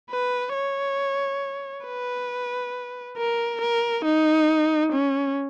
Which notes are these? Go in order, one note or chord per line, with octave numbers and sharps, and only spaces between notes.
B4
C#5
B4
A#4
A#4
D#4
C#4